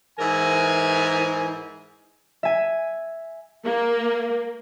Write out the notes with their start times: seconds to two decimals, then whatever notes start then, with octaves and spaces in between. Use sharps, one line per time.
0.19 G#2 E3 E4 A#4 C5 G#5
2.43 E5 G#5
3.65 A#3